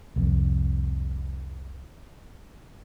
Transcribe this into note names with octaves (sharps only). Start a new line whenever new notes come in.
C2 F2